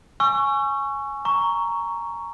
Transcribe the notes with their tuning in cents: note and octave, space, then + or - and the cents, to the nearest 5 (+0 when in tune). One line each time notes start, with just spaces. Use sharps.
G#5 +5 C#6 +0 E6 +40
A#5 +0 C#6 +10